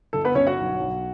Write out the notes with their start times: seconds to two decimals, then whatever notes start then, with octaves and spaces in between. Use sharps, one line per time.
0.13 G1 A4
0.25 B3 B4
0.35 G1 C#4 C#5
0.47 F#4 F#5
0.58 B1
0.80 B1